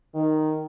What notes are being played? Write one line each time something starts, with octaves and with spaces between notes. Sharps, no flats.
D#3